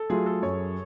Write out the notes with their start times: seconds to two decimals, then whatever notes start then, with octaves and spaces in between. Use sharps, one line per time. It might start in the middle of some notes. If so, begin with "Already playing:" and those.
Already playing: A4
0.10 F#3 A3 F4 G#4
0.26 A4
0.42 F#2 C#5